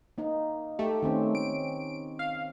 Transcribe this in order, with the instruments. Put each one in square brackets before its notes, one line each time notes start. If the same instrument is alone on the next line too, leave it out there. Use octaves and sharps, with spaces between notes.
[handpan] A#3 D#4
[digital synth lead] A3 [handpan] G4
[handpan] D#3 C4 C#4
[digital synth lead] D7
F5